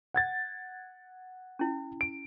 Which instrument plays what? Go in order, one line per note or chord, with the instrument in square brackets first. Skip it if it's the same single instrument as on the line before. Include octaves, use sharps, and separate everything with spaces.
[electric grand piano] F#5 G#6 A6
[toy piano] C#4 E4
[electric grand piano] D7